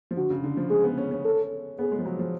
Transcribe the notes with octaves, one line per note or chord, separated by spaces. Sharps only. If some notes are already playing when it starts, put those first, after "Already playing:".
F3
D3 F#4
C#3
D3
F3
G#3 G#4
B3
C#4
C#4
A4
B3 G#4
G#3
F3
F#3
F3